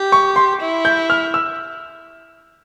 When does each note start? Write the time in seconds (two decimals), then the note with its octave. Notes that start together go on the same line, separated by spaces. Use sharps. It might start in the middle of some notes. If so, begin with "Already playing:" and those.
Already playing: G4
0.12 C#6
0.36 C6
0.61 E4
0.85 G6
1.10 F6
1.34 E6